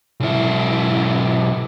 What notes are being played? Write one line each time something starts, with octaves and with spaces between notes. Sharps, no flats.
B1 E4